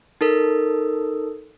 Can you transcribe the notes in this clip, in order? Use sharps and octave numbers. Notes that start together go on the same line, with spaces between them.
D#4 A4 A#4